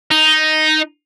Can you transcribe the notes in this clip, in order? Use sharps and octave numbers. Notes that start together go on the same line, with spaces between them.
D#4